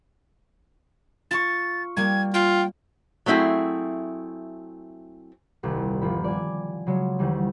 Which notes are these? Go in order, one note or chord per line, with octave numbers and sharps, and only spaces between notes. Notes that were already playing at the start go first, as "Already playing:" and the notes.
F4 C#6 A6
G3 A#3 G#6
F4 G5
F#3 A3 C4 E4 G#4
D#1 C2
G1 F3 B5
D5 G#5
C#3 F#3 G#3
D2 D#3 E3 G3